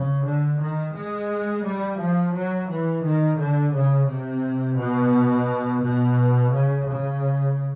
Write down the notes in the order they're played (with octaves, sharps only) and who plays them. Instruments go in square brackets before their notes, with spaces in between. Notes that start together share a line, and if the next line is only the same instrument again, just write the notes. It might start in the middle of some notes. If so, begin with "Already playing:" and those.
Already playing: [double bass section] C#3
D3
D#3
G#3
G3
F3
F#3
E3
D#3
D3
C#3
C3
B2
B2
C#3
C#3